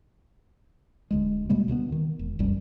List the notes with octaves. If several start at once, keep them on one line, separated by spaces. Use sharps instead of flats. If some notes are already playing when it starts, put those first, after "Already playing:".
D1 D2 G#3
B2 G3 G#3 A#3
D2 B2 A3 B3
D#3
E1
F1 C2 F#2 G3